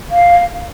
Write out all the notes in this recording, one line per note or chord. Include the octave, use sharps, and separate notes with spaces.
F5